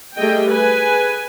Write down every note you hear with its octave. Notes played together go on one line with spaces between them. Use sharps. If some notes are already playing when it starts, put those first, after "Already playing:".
G3 A3 G#4 D#5 G5
G#4 B4 G#5